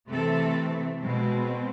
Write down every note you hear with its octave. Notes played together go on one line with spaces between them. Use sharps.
C3 E3 A3 C4 A4
B2 G#3 C4